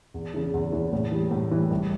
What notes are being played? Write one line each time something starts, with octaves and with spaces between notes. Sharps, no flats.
E2
C#3 E3
E2
C#3 E3
A2
E3 G3
A2
E3 G3
C2